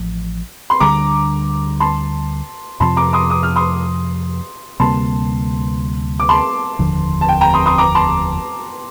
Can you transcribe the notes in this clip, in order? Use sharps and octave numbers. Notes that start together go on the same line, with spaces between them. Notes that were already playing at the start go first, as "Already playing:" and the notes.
Already playing: A1 A2 F3
C6
D2 D3 G3 D4 A#5 D6
A5 C6
F2 C3 F3 A5 C6
A#5 D6
C6 D#6
D#6
F6
C6 D#6
D2 C3 G3 A#3 A5 C6
D6
A5 C6
F1 D#2 D3 F3
A5
G5
G5 A#5
C6 D#6
C6 D#6
A#5 D6
A5 C6